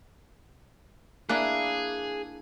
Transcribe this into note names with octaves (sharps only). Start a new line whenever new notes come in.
A#3 D4 E4 G#4 F#6